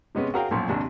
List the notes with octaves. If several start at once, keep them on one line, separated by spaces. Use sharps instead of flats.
C3 G#3 B3 C#4
F#4 G#4 A#4 C#5 F5 G5
B1 F#2 A#2 F3
G#1 D#2 C3 D4